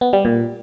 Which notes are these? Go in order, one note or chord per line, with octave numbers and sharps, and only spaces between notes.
B3
G3
A#2